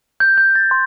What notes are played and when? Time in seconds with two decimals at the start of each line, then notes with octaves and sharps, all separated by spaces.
0.20 G6
0.38 G6
0.55 A6
0.71 C6